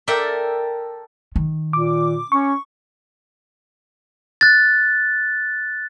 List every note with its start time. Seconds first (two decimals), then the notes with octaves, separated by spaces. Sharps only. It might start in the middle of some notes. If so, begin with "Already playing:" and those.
0.08 A4 A#4 D5 E5 G5
1.36 D#3
1.73 A#2 D6
2.32 C#4 C#6
4.41 F#6 A6